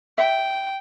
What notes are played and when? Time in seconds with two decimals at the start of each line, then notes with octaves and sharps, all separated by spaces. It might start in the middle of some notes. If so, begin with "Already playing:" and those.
0.18 E5 G5